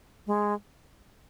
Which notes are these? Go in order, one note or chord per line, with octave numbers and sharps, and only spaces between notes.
G#3